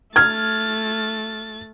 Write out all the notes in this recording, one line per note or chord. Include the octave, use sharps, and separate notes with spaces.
A3 F6 G#6 A6